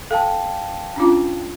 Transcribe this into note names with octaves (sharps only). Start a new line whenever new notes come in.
A4 F5 G5 A5
C#4 D4 F4